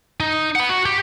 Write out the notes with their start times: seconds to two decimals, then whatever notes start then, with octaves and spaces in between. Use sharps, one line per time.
0.20 D#4
0.56 F#5 B5
0.69 F#4
0.86 G4